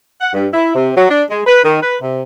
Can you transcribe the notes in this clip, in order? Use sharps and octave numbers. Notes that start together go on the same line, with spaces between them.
F#5
G2
E4
C3
F#3
D4
G#3
B4
D#3
B4
C3